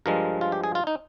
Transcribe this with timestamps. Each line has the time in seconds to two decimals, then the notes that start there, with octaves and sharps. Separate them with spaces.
0.06 G2 F3 G#3 A#4
0.41 F4
0.52 G4
0.64 G#4
0.75 F4
0.87 D#4